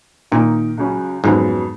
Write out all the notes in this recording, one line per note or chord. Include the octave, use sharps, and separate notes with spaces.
A#2 D#3 A#3 D#4 A#4
C#2 C#3 F#3 C#4
F2 G#2 C#3 F#3 B3